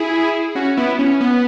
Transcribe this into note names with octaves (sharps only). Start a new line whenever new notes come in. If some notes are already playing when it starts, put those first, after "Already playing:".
Already playing: E4 G#4
C#4 F#4
B3 E4
C#4
B3